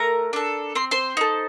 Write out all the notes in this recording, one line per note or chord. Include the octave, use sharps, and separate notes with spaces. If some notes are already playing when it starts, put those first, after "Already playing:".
Already playing: A3 A#4 A#5
D4 A4
C4 C6
C5 C6
D#4 A4